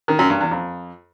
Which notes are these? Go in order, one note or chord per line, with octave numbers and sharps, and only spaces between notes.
D#3
F#2
G2
E2
F2